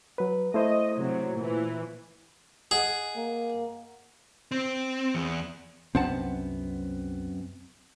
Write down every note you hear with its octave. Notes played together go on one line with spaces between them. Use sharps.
F#3 B4
A3 E4 C5 D#5
C3 F#3
A#2 E3
G#4 D#5 F#5 G#5
A#3
C4
E2
C2 F#2 C3 B3 C4 D4 F#5 A5